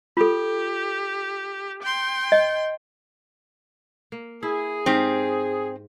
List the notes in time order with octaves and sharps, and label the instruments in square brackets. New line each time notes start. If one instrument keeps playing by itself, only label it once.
[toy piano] F4 A4 [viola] G4
[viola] G5 C6
[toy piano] D#5
[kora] A#3
[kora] E4 [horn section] G#4
[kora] G#2 G4 F5 [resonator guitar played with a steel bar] C4